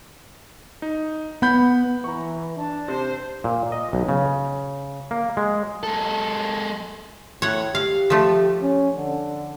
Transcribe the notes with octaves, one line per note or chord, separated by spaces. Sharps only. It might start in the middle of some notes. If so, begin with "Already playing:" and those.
D#4
B3 F#5 B5 G6
E3 A#5 C#6
D4 A5
C3 C5
A#2
D#5
B1
C#3
A#3
G#3
G#3 A4
A2 C#5 F#5
G4 F5
F3 A3
C#4
D3